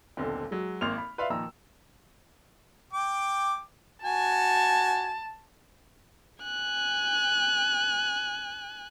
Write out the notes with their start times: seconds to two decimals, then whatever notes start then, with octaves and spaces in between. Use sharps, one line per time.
0.17 D#1 B1 D3 C4
0.51 F#3 G#3
0.81 G#1 A#3 C6 F6 F7
0.98 B5
1.18 B4 D5 E5 F5 B5 C6
1.30 A#2 D#3 F3 A#5 E6
2.93 G5 D6
4.05 F#4 G#5 A5
6.44 G#5 F#6